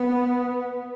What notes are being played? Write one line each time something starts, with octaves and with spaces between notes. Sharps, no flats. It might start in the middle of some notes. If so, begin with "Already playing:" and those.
Already playing: B3